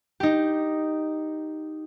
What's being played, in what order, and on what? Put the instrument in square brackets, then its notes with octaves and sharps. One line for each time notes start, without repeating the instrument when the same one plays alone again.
[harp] D#4 G4